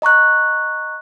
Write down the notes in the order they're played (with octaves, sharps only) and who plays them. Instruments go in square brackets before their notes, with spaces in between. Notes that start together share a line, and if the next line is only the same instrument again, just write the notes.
[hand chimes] D#5 A#5 C#6 F#6